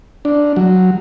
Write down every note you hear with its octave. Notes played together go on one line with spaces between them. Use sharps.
D4
F#3